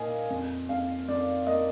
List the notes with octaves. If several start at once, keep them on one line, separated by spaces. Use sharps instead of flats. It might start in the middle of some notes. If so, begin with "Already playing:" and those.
Already playing: A#2 A#3 D#5 F5 G#5
F2
F2 F5
F2 D5
A#3 D#5